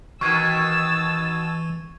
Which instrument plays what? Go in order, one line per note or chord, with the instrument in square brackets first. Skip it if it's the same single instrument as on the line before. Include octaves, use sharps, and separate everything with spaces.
[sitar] B2 D#3 [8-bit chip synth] E3 [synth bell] C#6 G#6 [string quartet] E6 A6